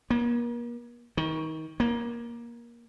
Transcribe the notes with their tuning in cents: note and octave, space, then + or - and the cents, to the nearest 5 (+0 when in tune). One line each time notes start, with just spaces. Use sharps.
A#3 +40
D#3 +30
A#3 +20